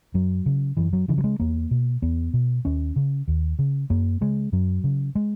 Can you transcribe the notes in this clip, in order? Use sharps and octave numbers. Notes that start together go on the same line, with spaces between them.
F#2 F#3
C#3
F#2 E3
F#3
C#3 E3
F#3
G#3
E2 A#3
B2
E2 B3
B2
D#2 C#4
C#3
D#2
C#3
F#2 A#3
C#3 G#3
F#2 F#3
C#3
G#3